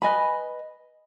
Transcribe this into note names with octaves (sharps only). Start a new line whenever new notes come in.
B4 D#5 G#5 B5